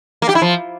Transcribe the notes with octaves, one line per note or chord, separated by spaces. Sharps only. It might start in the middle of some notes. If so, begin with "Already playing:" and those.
A#3
G4
E4
F3